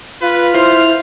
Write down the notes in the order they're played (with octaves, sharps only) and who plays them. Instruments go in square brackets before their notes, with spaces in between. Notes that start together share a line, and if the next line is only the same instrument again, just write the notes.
[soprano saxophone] F4 [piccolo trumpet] B4
[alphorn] E4 [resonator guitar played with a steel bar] C5 [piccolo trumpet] F6